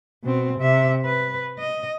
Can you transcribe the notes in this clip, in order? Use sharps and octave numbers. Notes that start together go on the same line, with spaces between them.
B2 C4
C3 E5
B4
D#5